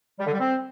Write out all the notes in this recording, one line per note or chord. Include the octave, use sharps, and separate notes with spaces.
G3
D3
G3
C4